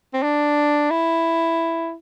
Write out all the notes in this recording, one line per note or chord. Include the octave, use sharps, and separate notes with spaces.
C4
D4
E4